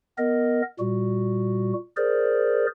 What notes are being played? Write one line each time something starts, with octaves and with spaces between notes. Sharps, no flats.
B3 A#4 D#5
A#2 G3 F#4
G#4 A#4 C5 D5